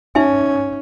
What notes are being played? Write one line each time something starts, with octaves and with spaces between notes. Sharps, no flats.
C#4 D#4 E5 G#5